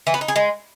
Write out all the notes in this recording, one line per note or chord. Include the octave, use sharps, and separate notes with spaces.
E3
B3
D#4
G#4
G#3